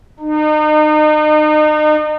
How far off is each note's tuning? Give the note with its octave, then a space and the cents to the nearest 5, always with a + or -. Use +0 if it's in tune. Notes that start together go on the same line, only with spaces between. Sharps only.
D#4 -35